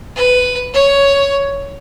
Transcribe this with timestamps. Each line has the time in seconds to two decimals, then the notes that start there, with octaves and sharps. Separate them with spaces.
0.16 B4
0.74 C#5